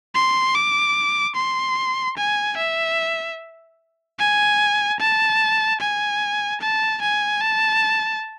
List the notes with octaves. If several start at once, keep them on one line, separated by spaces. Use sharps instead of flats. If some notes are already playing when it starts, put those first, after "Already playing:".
C6
D6
C6
G#5
E5
G#5
A5
G#5
A5
G#5
A5